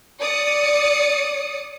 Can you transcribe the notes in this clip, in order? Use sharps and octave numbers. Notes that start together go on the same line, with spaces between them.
D5 D#6 C#7